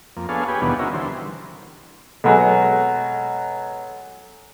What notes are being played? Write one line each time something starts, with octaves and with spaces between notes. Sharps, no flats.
F2 A#3
B3 D4 G#4 A4 C#5 F5
G4 G#4 B4 C#5
D#2 B2 E3 G3 B3 D4
C4 C#4 D#4 E4 F#4 A#4
D3 E3 G3 C5
B2 F#3 G#3 A4 F#5 G#5